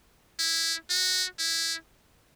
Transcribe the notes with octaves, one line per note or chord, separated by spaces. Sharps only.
E4
F#4
E4